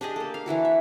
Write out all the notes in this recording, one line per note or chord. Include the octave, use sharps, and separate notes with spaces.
D4 G4 G#4 D#5
A#3 A4
F5
E3 D4 E4 F#4
E5